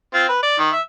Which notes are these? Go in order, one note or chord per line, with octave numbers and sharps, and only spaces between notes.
C4 F4
B4
D5
D#3
E5